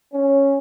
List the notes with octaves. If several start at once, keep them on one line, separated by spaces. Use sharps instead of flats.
C#4